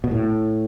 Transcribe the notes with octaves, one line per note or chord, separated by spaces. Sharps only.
B2
A2